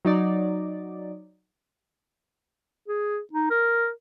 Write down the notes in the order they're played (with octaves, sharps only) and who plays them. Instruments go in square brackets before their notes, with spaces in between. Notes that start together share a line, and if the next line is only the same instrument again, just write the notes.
[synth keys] F#3 D#4 D5
[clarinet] G#4
D#4
A#4